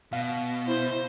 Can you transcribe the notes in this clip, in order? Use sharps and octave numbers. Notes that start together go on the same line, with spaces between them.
B2 F5
E4 C5